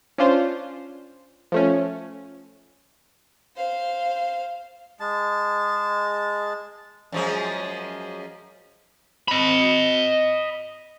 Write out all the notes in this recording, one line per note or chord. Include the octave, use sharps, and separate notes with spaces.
C#4 D4 F4 C5
F3 A3 C#4
C5 F5
G#3 A5
F#2 F3 G#3
D#5 B5